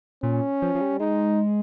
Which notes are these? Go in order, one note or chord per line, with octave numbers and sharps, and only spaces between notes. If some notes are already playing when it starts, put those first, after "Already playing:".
A#2 C#4
F3
F3
G3
G#3 D#4